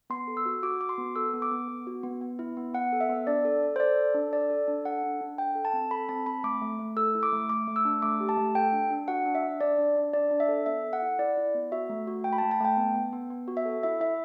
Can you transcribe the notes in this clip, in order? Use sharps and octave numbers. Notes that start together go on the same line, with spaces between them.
B3 C6
A4
E6
F#4
F#4 D6
F#4 D6
C6
B3
A4 E6
B3
D6
B3
B3
F#4
B3
B3
E4
B3
B3 F#5
A4
E5
B3
D4 D5
A4
A4
C5
A4 D5
A4
D4
A4 D5
A4
D4
A4 F#5
D4
D4
A4 G5
A4
A5
C4
A4 B5
C4 A5
C4 B5
A3 D6
A3
A3
A4 E6
E4
D6
A3
A3 D6
A3
E6
D4
A3 D6
G4
A5
A3
A4 G5
D4
D4
F#4 F#5
D4
E5
D4
D4 D5
D4
D4
D4 D5
D4
E5
A4
B3 E5
A4
F#5
E4
E4 D5
E4
B3
F#4 E5
A3
F#4
A3 G5
B5
A5
A3
A5
A3 G5
B3
B3
B3
B3
F#4
E5
A4
E4 E5
E4 E5